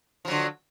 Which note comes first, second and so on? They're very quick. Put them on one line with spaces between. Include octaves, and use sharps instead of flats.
F3 F#3 D3